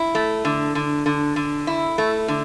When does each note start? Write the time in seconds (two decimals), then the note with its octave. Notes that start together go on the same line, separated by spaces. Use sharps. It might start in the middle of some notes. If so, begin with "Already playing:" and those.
Already playing: E4
0.15 A3
0.45 D3
0.75 D3
1.06 D3
1.36 D3
1.67 E4
1.98 A3
2.28 D3